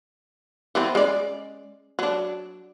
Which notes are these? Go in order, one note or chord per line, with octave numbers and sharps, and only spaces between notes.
E3 B3 C4
G#3 C#4 D5
F#3 D4